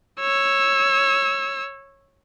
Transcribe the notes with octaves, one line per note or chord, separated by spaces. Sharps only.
C#5 E6